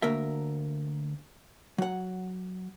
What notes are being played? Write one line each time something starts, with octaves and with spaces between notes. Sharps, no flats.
D2 A#3 A#4 E5
F#3 F#5